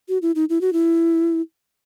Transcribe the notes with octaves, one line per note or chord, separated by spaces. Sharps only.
F#4
E4
D#4
E4
F#4
E4